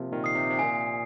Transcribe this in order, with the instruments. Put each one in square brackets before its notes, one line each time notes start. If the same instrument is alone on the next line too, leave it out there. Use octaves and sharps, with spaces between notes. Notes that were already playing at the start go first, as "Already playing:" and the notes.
Already playing: [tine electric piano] C3 F3 A#3
A#2 D#3
[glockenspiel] D#6 C7
[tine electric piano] C3
C3
[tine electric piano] A#2 [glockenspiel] G#5